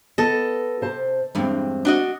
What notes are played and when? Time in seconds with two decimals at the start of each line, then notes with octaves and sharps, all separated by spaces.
0.18 B3 A4 D#5
0.81 C3 C5 A5
1.35 E2 G2 G#3 C4
1.85 D4 F#4 D#5